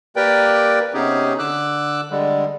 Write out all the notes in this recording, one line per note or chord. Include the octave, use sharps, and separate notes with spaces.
A#3 G4 A#4 B4 D5 G5
C3 B3 C#4 D#4 G4 G#4
D3 D6 E6 F#6
D3 G3 G#3